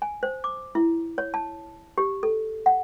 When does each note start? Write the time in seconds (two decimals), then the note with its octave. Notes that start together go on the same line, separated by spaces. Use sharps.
0.02 G#5
0.23 C5
0.44 D6
0.75 E4
1.18 C#5
1.34 A5
1.98 G4
2.23 A4
2.66 F#5